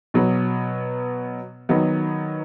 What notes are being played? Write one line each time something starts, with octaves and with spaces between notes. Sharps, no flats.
B2 F#3 B3
D#3 F#3 B3 D#4